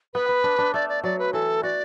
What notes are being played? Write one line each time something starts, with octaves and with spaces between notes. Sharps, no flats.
B3 B4
B3
D4
D4
A3 D5
D5
F#3 D5
B4
E3 A4
F#4 D5